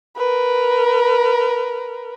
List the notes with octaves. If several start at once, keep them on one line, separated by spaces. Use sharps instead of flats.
A#4 B4